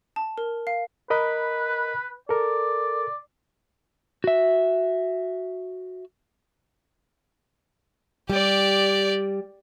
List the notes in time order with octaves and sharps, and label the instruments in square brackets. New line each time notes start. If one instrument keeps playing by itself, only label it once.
[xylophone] A5
A#4
F5
[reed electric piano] A#4 D#5 B5 [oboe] B4
[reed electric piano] A4 A#4 [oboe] D5
[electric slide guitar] F#4 E5
[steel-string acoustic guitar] G3 [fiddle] G4 D5